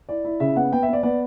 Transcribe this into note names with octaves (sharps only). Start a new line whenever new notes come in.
E4 D5
E4
C#3 E5
B3 F#5
B3 G5
E5
B3 D5
B3 D5